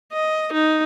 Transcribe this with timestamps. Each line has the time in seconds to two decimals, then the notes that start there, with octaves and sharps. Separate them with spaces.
0.12 D#5
0.53 D#4